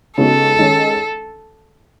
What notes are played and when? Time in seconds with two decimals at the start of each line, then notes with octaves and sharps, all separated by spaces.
0.18 C#3 G#3 B3 D#4 F#4 A4
0.59 D#3 G#3 C#4